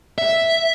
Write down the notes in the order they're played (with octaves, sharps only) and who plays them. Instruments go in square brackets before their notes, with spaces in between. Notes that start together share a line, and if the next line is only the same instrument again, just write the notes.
[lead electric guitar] E5